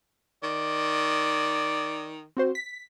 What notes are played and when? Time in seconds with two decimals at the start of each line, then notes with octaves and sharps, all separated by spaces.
0.43 D#3 D5
2.37 C4 F#4 C5
2.55 B6